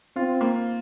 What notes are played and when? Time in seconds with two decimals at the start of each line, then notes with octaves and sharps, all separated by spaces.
0.16 C4 F4
0.41 A#3